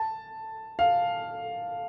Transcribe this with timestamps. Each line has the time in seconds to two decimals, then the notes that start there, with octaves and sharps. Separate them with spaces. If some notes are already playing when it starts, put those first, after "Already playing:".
Already playing: A5
0.79 F5